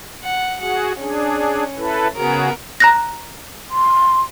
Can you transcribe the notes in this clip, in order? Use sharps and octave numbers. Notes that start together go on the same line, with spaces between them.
F#5
F#4 G#4 F#5
C#4 D4 G#4
E4 A4 B4
C#3 B3 F#4 G#4 A#4
A#5 F#6 A#6
C6